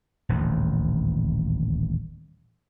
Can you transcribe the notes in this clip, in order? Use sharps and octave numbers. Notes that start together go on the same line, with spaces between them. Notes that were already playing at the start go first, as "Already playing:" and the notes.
D#1 A1 D2